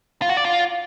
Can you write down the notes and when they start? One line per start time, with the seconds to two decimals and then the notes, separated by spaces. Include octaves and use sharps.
0.22 F4
0.29 F#4
0.37 D5
0.45 F4